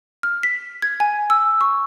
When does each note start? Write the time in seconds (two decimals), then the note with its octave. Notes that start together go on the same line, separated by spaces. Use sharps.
0.23 F6
0.43 B6
0.82 G#6
1.00 G#5
1.30 E6
1.61 C#6